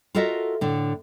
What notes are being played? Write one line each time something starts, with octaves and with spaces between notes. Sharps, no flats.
F4 F#4 A4 A#4 D#5 E5
A2 D3